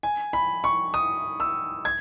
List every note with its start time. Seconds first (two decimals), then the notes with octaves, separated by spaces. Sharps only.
0.03 G#5
0.33 B5
0.64 C#6
0.94 D#6
1.40 E6
1.85 G#6